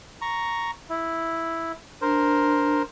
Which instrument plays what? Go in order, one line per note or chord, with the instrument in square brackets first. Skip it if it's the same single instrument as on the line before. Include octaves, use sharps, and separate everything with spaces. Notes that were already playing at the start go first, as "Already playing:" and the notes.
[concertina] A#5 C#6
E4
[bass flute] D4 [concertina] A#4 C5